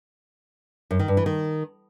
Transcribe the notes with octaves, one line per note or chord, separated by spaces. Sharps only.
F#2
D#3
G2
E3
D#3